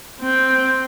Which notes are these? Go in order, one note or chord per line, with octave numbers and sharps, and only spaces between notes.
C4 G5